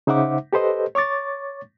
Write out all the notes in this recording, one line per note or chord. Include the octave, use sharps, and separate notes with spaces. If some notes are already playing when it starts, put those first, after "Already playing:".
C#3 D#4 C5 E5 F#5 D6
G4 A4 B4 C5 D#5
C#5 C#6 D6 A6